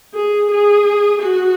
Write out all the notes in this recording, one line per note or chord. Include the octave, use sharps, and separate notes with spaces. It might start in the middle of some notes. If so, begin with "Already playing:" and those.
G#4
G#4
F#4